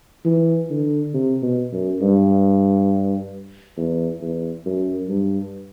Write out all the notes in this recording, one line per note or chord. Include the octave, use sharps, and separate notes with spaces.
E3
D3
C3
B2
F#2
G2
E2
E2
F#2
G2